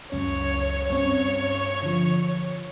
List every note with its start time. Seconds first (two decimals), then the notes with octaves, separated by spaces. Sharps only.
0.12 C#2 F#2 C#4 C#5
0.90 G2 C4 C#4 C#5
1.83 D3 F3